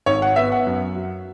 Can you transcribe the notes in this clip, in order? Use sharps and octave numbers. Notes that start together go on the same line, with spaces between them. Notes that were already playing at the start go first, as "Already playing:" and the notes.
G#1 C#5
F#5
B3 E5
F#5
F#2
F#3